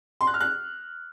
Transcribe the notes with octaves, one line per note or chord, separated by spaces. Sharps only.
C6
F#6
F6
F#6